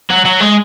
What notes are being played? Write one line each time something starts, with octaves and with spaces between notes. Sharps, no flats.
F#3
F#3
G#3